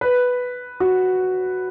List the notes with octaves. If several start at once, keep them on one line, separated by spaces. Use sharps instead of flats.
B4
F#4